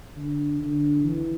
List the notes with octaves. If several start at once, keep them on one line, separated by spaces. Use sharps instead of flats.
D3
D3
E3